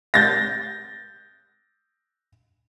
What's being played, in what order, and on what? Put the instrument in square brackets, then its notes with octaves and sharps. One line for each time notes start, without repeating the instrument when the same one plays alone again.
[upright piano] G6 A6 A#6